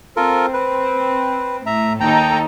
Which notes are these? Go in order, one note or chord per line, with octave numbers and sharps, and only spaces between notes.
C4 F4 A4 A#4
B4
A2 E5 A#5
D#2 D#4 A4 G5 A#5